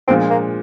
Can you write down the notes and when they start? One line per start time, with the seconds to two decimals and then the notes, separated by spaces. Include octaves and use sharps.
0.08 A#2 F3 G#3 C4 D4
0.30 A#3